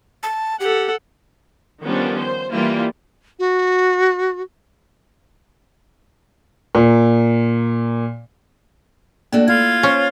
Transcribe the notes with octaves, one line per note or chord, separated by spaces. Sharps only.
A5
G4 A4 F#5
D#3 F3 G3 B3 C#4 D4
C5
E3 G3 A#3 E4 F4
F#4
A#2
A3 A#3 D4 F#4
E4 F4 G#6
C#4 C5